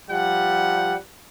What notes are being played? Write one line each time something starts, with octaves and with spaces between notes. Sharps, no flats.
F3 G3 F#5